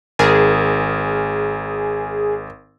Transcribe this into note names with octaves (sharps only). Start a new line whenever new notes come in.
G#1 G#4 A#4